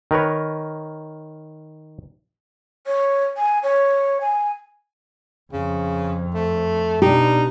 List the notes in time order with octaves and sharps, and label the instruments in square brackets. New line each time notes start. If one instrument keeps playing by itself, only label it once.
[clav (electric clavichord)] D#3 A#4 B4 C#5
[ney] C#5
G#5
C#5
G#5
[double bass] F2 [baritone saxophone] C#3
[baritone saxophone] A3
[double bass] B2 D4 [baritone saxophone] D#4 [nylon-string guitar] G4